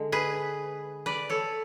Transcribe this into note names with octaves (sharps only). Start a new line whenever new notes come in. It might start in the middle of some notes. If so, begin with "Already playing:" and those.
Already playing: D3 G#3
G#4 B4
B4 D5
A4 C#5